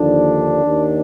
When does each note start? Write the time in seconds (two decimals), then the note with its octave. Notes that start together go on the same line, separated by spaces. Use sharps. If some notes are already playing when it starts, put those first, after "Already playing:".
Already playing: D#2 D3 F3 D4
0.64 D#2 D#3